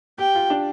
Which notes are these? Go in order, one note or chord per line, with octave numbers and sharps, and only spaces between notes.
G4 G5
F4
D4